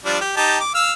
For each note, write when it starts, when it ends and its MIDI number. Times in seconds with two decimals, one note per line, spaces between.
0.05 0.18 53
0.05 0.18 55
0.05 0.18 62
0.21 0.33 67
0.37 0.58 63
0.37 0.58 67
0.37 0.58 81
0.60 0.74 86
0.75 0.93 77
0.75 0.93 88
0.75 0.93 89